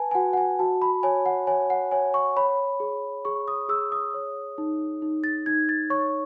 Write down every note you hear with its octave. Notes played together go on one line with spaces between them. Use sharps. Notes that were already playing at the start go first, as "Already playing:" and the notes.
Already playing: B4 G#5 A5
G#5
F#4 F#5
F#5
G#5
F#4 A5
B5
C#5 G#5
F#5
C#5 G#5
F#5
C#5 G#5
C#6
C#5 B5
G#4
G#4 C#6
D#6
G#4 E6
D#6
C#5
D#4
D#4
A6
D#4 G#6
A6
C#5 C#6